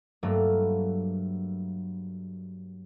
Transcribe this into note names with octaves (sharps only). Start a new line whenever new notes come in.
G2 F#3 A3 A#3